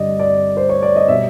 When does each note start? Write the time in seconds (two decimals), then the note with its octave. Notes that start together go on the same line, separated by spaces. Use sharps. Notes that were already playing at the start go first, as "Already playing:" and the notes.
Already playing: G2 D3 G3 D5 D#5
0.20 D5
0.57 C5
0.69 C#5
0.82 D5
0.96 D#5
1.08 B2 G3 E5